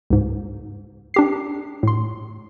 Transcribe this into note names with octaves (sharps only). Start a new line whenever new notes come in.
C#2 G#2
D4 G4 C7
A2 C6